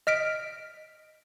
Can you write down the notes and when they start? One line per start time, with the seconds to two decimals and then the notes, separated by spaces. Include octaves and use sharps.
0.07 D#5 F6 B6 D7